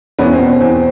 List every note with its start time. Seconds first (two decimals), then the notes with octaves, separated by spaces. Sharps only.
0.19 E2 B3 C#4
0.33 C4
0.39 B2
0.60 E2 C4